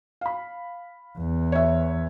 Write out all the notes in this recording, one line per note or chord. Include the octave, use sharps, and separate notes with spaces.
F5 B5
E2
C#5 E5